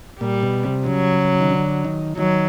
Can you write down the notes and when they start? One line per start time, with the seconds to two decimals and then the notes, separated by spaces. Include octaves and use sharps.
0.20 A#2 G3
0.43 B2
0.65 C3
0.86 C#3 F#3
1.40 D#3
1.51 D3
1.85 D#3
2.18 D#3 F#3